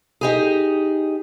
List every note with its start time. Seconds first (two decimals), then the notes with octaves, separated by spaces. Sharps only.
0.21 D#4 G4 G#4